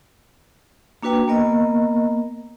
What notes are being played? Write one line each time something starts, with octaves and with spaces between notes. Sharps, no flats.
A#3 D4 F#4 B4 G5
A#3 B3 A#4 D#5